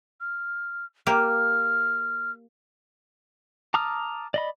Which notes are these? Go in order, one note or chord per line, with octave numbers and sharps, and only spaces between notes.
F6
A#3 G4 F6
A5 A#5 D6 D#6 F6
D5 D#5 B5